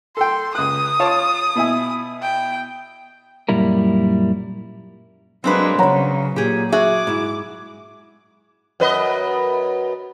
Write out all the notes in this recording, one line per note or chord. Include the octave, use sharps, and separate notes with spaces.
A4 G5 C6
C#2 D#6 F#6
F4 C#5 A5
B2 E4 G#5
G5
F#2 A#2 G3 E4 A#4
F#3 G#3 A#3 C4 D4 B4
C#3 F#3 C#5 F#5 A#5 B5
A#2 G4 G#4
F#4 G#4 E5 D6
G#2 E4
F#2 B4 D#5